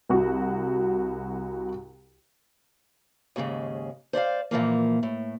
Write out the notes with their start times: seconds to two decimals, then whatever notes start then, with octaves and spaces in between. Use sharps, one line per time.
0.09 C2 F#4
3.36 D#2 G#2 C#3 G#3
4.13 C5 D5 E5 F5
4.51 A#2 E3 F3 A#3
5.03 A2